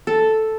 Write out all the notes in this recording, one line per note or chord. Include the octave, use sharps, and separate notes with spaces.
A4